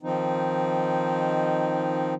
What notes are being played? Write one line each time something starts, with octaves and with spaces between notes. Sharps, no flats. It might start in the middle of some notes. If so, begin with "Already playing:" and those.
D#3 F3 C4 D#4